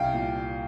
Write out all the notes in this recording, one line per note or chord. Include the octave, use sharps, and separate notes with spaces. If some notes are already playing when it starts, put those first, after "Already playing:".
Already playing: C2 F5 G5
A#2